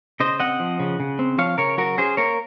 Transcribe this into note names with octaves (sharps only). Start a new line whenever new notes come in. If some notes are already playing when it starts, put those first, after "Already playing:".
C#3 C5 D#5
C4 D#5 F#5
F3
C#3
C#3
C4
F3 C#5 F5
C#3 A#4 C#5
F#3 F#4 A#4
C#4 G#4 C5
A#3 A#4 C#5